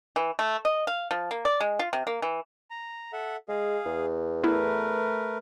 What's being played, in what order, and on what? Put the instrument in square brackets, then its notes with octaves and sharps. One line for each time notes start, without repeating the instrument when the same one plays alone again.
[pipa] E3
A3
D#5
F5
F3
A#3
D5
G#3
F4
C3
A#3
E3
[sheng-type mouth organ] A#5
A4 E5 F#5
[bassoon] G#3 [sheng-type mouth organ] G#4 F5
[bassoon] E2
[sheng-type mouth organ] A3 A#4 B4 [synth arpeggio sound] B3 E4